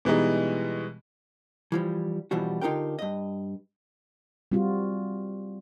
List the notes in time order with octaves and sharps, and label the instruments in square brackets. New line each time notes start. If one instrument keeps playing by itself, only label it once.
[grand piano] B2 E3 G3 G#3 D#4
[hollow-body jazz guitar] E3 F3 G3
B2 E3 F3 G3 F#4
D3 D#4 F4 G4 A#4 G5
G2 D#5
[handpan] G3 C4 F4 F#4